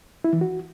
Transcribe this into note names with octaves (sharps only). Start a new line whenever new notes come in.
E4
E3
F#4